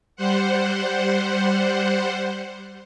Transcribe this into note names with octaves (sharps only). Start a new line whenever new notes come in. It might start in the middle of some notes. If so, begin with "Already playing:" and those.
G3 C5 F#5